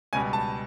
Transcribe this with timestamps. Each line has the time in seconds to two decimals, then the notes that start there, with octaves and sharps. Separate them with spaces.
0.13 C#2 B2 G3 G#5
0.33 A5